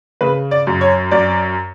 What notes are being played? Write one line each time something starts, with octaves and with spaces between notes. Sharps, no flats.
C#3 B4
D5
F#2
C#5
F#2 D5